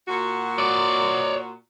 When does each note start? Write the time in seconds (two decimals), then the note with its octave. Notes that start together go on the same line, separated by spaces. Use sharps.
0.08 A#2 F#4
0.58 C#5 D5